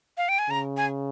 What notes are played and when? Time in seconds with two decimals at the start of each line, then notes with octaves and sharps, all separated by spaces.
0.17 F5
0.29 G5
0.39 G#5
0.50 C#3 A#5
0.77 G#5